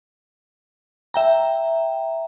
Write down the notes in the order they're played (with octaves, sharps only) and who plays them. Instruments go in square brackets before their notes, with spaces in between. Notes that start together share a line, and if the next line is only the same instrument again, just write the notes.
[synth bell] E5 G5 A#5